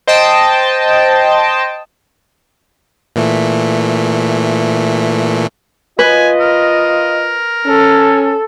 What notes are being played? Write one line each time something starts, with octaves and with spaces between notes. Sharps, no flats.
C5 D#5 G5 A5
A#2 E3 A3
F4 B4 D#5 G#5
A#4
C#4 A4